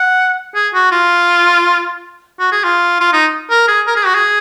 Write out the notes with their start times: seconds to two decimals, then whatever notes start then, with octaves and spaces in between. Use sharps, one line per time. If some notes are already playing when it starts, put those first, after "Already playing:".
Already playing: F#5
0.55 G#4
0.74 F#4
0.92 F4
2.40 F#4
2.52 G#4
2.64 F4
3.00 F4
3.13 D#4
3.50 A#4
3.68 G#4
3.87 A#4
3.96 G#4
4.06 F#4
4.15 G#4